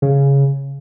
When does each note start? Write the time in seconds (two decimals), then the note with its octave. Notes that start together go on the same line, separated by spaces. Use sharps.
0.02 C#3